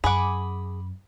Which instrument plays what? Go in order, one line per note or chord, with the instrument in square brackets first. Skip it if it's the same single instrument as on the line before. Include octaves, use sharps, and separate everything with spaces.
[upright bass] F#2 [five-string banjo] G#4 F#5 [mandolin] B5 D6